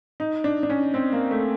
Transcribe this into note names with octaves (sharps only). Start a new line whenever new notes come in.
D#4
D4
D4
C#4
C4
A#3
A3